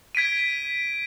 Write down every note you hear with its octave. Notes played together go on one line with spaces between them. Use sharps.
G#6 B6 D7 D#7